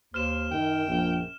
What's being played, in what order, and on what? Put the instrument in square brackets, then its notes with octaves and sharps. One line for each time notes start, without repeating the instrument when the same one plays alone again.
[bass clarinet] D#2 [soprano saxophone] C5 [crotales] F6 E7
[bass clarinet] F#2 [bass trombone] D#3 [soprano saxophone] G5
[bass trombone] A#1